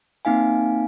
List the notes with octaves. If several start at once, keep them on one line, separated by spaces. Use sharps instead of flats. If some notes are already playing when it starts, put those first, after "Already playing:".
A#3 C4 D#4 F5 G#5